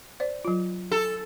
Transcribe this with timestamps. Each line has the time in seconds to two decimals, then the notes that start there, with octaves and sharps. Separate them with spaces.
0.20 C5 D5
0.45 F#3 F4
0.92 A4